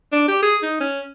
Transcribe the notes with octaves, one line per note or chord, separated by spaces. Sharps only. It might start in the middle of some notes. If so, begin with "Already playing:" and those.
D4
G4
G#4
D#4
C#4